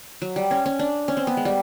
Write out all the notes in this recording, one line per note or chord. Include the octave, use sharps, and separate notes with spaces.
F#3
G3
C#4
C#4
D4
C#4
C4
B3
G#3
G3